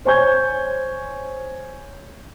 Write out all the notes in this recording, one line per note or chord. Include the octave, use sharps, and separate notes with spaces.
C5 C#5 G#5 C#6 G6 G#6